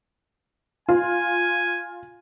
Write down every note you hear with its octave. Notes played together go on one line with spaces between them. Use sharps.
F4 G#5